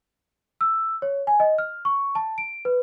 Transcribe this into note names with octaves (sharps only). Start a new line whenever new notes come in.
E6
C#5
G#5
D#5
F6
C#6
A5
D7
B4